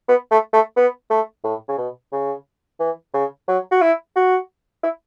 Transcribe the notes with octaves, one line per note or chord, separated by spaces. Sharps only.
B3
A3
A3
B3
A3
A2
C#3
B2
C#3
E3
C#3
F#3
F#4
E4
F#4
E4